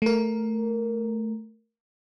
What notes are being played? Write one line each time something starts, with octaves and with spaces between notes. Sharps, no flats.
A3 A#4